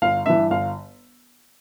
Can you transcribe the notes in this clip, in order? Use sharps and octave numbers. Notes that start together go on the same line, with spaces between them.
G1 F5
G2 E3 E5
G1 F5